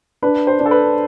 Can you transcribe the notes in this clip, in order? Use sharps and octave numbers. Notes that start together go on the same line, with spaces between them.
D4 B4
C5
D4
A4
B4